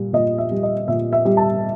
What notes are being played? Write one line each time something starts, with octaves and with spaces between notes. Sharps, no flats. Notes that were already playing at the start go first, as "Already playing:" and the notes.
Already playing: A#2 G3
A#2 D#5
E5
G3
D#5
A#2 E5
E5
G3
A5